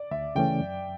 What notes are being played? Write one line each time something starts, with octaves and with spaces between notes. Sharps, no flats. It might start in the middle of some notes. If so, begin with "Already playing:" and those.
Already playing: D5
D2 E5
C#3 E3 A3 C#4 G5
F#2